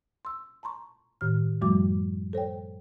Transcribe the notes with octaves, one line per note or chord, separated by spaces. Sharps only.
C6 E6
A5 A#5 C6 C#6
A2 D#3 F6
F#2 F3 G3 A3 F#4 D6
A4 C5 C#5 G5